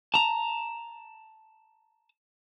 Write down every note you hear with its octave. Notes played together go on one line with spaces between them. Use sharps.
A5 A#5